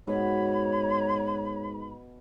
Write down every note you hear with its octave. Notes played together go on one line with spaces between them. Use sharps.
G#2 B2 C#5 B5